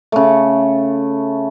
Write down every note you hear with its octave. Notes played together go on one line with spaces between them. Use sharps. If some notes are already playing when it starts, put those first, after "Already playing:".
C#3 A3